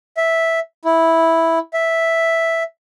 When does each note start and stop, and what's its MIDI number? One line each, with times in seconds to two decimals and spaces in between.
0.17 0.59 76
0.85 1.59 64
1.73 2.63 76